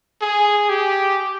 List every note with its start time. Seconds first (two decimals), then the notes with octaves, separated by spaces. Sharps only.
0.22 G#4
0.70 G4